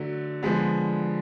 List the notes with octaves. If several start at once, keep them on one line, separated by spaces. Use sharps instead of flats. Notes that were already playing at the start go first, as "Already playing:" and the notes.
Already playing: D3 F#3 A3
D3 F3 G#3 B3